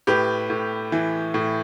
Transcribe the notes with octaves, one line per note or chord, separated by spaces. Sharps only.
A2 G4 B4
A2
E3
A2